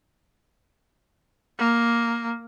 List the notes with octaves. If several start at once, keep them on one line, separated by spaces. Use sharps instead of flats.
A#3